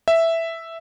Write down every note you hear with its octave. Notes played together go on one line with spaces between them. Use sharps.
E5